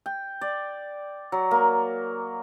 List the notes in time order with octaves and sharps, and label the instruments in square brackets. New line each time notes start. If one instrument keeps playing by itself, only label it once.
[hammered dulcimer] G5
D5
F#3
A#3